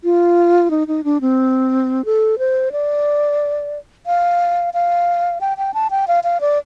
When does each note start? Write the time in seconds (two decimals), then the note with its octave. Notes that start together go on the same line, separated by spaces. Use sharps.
0.04 F4
0.71 D#4
0.88 D#4
1.04 D4
1.21 C4
2.05 A4
2.38 C5
2.72 D5
4.06 F5
4.74 F5
5.41 G5
5.58 G5
5.74 A5
5.91 G5
6.08 F5
6.24 F5
6.41 D5